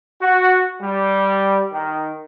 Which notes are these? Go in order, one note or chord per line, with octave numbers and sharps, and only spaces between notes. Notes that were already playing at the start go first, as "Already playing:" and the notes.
F#4
G3
D#3